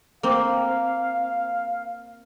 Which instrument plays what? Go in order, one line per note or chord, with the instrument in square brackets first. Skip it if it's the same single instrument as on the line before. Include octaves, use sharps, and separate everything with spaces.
[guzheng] A#3 C4 [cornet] F5